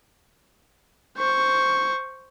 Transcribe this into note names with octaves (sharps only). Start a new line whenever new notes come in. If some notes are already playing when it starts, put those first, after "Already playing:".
C5 C#6